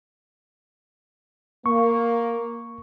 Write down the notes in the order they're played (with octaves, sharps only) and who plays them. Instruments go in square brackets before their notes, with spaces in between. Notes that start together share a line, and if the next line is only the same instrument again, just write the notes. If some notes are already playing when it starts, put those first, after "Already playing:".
[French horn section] A#3 [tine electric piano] C#6